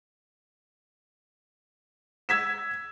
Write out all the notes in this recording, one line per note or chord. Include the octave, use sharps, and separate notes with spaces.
E6 G#6 B6 E7